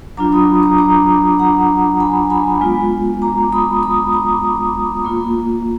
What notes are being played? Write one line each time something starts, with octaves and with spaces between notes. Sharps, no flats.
F#3 D4 F4 A#5 D6
B5 D#6
A#5 D6
A#5 D6
F#5 A#5
G#5 B5
G#5 B5
G#3 B3 F4
A#5 D6
B5 D#6
B5 D#6
A#5 D6
A#3 F4